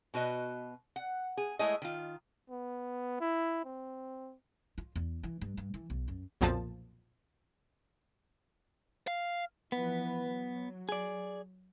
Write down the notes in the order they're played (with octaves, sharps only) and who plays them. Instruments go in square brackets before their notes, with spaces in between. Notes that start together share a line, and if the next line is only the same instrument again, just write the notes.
[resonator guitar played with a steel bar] B2 F#4 B4 D#5
F#5
G#4
G#3 A3 E4 G#4 C#5 D#5
D#3 F4
[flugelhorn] B3
E4
C4
[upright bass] F4
E2
E3
G2
G2
E3
B1
F#2
[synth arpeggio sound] B1 F2 A#2 F3 A5
[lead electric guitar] F5
[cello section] E3 F3 B4 [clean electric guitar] B3
[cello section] F#3
[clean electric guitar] G#4 D5